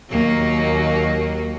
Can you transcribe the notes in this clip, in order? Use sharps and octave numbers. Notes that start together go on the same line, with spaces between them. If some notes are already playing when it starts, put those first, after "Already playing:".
D#2 F#3 A#3